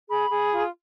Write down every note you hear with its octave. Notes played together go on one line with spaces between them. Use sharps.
G#4 B5
G#4
F4